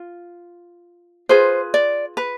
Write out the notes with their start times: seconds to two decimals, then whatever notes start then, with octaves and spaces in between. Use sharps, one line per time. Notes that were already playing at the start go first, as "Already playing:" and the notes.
Already playing: F4
1.29 F4 G#4 B4 C5
1.74 D5
2.17 B4